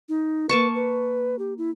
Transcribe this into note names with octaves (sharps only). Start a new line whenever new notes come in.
D#4
A#3 B4 A5 C#6
B4
G4
E4